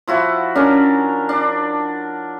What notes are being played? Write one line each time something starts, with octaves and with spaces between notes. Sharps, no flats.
F3 E4 F#4
C#4 D4 A#4
D4